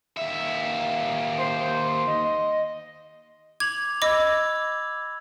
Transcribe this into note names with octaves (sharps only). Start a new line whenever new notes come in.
D#2 E5
C5 C6
D#5
D6 G#6 F7 F#7
D#5 B5 D6 E6 G#6